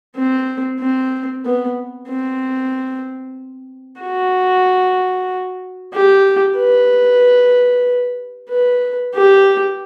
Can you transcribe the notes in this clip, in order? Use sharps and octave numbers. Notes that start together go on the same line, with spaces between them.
C4
C4
B3
C4
F#4
G4
B4
B4
G4